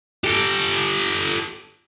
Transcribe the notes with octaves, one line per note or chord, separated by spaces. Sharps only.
G4 A4